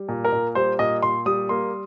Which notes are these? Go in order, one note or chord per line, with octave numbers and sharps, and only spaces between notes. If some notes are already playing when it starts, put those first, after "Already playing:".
Already playing: G3
A#2
A#4
A#2
G3 C5
A#2 D#5
A#2 C6
G3 D#6
A#3 C6